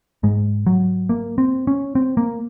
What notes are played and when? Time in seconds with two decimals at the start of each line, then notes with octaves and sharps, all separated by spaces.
0.23 G#2 G#3
0.67 F#3
1.09 A#3
1.38 C4
1.67 C#4
1.95 C4
2.17 A#3